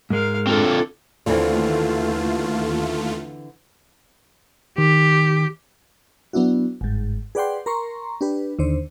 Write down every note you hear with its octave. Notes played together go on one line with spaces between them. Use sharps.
G#2 G#3 A#4 F5
C4 D4 F4 A4 A#4
D#2 D3 E3 A3 C4 F4
D#3 G4
F#3 B3 D4 E4 F#4
G1 G#2
G#4 B4 D5 F#5 G5 C6
A#4 A#5 C6 C#6
D4 G4 B4
D#2 D3 C5